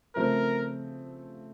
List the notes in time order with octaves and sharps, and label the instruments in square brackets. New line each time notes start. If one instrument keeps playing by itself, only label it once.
[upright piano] C#3 F3 A3 C4 [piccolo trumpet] A#4